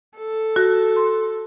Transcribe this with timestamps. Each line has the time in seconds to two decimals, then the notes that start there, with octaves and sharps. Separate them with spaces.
0.18 A4
0.56 F#4 A#6
0.96 C6